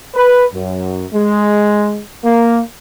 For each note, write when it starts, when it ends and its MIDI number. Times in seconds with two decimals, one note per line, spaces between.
0.15 0.45 71
0.53 1.05 42
1.13 2.00 56
2.24 2.60 58